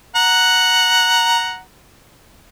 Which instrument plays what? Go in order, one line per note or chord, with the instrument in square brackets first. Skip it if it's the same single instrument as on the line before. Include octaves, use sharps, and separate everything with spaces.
[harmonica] F#5 A#5